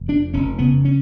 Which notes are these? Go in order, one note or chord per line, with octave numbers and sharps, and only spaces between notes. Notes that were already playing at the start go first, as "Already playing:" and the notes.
Already playing: F1
F2 D4
F1 C#4
C#3 B3
C#4